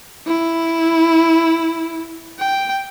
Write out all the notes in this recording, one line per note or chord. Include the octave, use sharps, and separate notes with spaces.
E4
G5